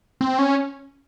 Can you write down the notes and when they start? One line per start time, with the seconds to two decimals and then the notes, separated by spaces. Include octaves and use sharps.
0.21 C4
0.39 C#4